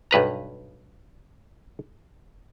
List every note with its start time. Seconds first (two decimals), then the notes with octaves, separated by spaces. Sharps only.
0.11 B1 G2 B4 A#5